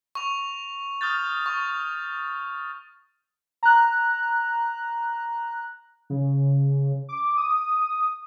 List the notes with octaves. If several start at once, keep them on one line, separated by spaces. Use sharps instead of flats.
C#6 F7
D#6 F6 G6 A6
C#6
A#5 F#6
C#3
D6
D#6